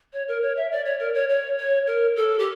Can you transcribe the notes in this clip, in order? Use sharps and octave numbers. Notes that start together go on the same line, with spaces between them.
C#5
A#4
C#5
E5
D5
C#5
A#4
C#5
C#5
C#5
A#4
A4
G4